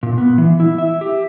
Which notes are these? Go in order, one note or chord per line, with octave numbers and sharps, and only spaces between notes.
A#2
B3
E3
E4
E5
G4